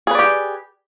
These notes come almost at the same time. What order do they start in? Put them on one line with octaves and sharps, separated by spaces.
G#4 B4 D5 G4